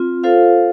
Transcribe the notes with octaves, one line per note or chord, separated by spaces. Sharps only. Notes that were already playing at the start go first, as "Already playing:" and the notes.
Already playing: C4 F4
F4 A4 C5 F5